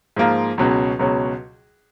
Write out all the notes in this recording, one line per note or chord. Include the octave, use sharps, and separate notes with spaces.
G#2 F3 A#3 F4
C#2 B2 F#3 C#4
C#2 B2 F#3 C#4